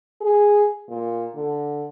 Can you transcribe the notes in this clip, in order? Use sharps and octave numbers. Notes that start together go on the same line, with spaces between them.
G#4
A#2
D3